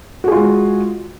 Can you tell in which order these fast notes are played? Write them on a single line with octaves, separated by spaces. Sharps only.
F#4 G#4 F4 G#3